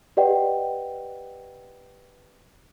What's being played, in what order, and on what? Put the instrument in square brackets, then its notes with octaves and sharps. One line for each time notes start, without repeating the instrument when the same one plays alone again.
[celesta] G4 B4 D5 D#5 F#5 G5